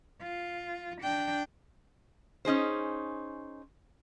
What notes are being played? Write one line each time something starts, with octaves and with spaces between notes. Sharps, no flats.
F4
D4 G5
C#4 D#4 G#4 C5